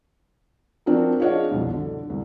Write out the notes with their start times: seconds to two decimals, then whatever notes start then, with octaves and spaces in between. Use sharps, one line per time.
0.86 F3 C4 D4 F4 F#4 A#4
1.20 D4 F4 G#4 C#5 D#5 F#5
1.51 C2 F2 B2
1.73 D3
2.10 C2